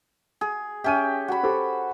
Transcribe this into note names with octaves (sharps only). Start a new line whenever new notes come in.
G#4
C#4 G4 E5 G5 D#7
F#4 B5
G4 A4 C5